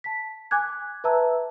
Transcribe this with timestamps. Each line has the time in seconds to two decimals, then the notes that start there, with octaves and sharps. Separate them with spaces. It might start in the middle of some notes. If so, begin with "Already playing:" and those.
0.04 A5 B6
0.51 G#5 D6 F#6 G#6
1.04 B4 E5 A5 A#5 E6